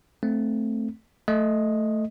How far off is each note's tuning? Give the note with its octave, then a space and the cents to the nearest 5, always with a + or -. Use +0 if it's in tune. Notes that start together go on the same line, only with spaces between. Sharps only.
A3 +0 C4 +0
A3 +0 D#5 +0